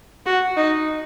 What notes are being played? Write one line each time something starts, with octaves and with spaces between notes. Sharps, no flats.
F#4
D#4